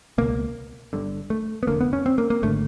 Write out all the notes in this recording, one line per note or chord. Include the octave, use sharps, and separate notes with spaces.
C#2 B2 A#3
G1 G2 D3
A3
B3
F1 D#2 D3 A#3
B3
C#4
C4
A#3
A#3
G#1 D3 A3